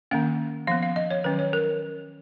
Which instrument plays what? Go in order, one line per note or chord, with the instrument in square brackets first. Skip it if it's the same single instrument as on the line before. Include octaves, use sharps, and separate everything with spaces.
[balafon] D#3 A#3 C#4 F#5
F3 B3 F5
F5
D#5
C#5
D#3 F#3 C#4 B4
C#5
A#4